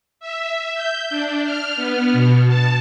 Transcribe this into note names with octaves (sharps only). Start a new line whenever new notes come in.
E5
G6
D4
F6
B3
B2
A5